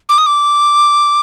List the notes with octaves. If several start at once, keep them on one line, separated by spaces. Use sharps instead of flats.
D6
D#6
D6